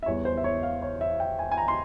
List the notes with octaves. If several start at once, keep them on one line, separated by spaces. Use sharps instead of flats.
E5
E2 E3 G3 C#5
C5
E5
C#5
F5
C#5
E5
G5
G#5
G#5
A#5
C6